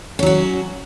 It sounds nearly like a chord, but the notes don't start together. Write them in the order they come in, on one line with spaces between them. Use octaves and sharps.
C#4 F#3 F#4